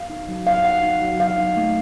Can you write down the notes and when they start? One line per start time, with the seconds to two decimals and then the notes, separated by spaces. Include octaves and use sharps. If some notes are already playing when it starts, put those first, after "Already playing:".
Already playing: F5
0.10 D#4
0.29 F#3
0.47 D#4 F5
0.65 D#4 F#5
0.83 D#4
1.01 F#3
1.19 F#3 F5
1.38 D#4
1.57 A3